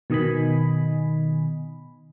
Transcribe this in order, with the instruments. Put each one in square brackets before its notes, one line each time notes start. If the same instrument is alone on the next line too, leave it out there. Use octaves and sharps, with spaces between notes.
[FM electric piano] B2 D#3 D#5 G#5 B5